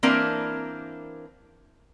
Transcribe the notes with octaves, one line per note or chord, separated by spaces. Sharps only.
E3 A#3 C4 D4 A#4 B4